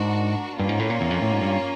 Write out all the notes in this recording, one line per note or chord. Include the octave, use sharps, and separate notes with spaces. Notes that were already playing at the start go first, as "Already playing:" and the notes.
Already playing: G#2 D4 F#4 A#4
G2 A#3 C#4 F4
G#2
A2
A#2
E2
F2
A2
G#2
G2